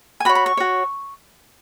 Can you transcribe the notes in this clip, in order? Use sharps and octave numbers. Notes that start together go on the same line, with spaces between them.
G#5
F#4 C#5 B5
B5
C#6
F#4 C#5